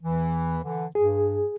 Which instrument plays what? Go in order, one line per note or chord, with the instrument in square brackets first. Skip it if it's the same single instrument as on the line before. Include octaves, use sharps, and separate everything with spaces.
[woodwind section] E2 E3
D3 E3
[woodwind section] G2 [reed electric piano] G#4